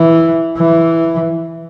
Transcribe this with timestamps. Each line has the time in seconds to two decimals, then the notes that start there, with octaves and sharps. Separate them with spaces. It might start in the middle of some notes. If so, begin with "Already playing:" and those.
Already playing: E3
0.57 E3